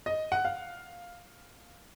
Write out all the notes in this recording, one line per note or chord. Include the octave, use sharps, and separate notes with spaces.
D#5
F#5
F5